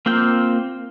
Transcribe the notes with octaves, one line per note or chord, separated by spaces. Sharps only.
A#3 C4 F4 G5